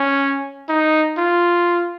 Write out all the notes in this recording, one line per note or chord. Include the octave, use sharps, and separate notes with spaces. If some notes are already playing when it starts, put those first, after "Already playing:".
Already playing: C#4
D#4
F4